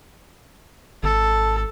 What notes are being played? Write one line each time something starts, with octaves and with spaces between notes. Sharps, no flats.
G#1 A4